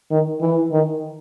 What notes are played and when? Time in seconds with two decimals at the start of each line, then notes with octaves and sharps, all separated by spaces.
0.11 D#3
0.41 E3
0.71 D#3